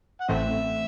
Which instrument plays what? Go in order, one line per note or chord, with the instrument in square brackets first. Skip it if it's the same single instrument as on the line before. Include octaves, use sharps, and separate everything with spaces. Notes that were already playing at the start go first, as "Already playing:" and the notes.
[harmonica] F#5
[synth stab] A1 A2 E3 A3 C4 [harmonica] E5